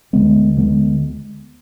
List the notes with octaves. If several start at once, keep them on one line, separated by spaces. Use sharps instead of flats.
D2 D3 G#3 B3
D2 D3 G#3 B3